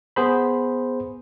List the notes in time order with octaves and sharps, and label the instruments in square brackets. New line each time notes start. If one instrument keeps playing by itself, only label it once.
[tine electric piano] B3 G#4 C5 B5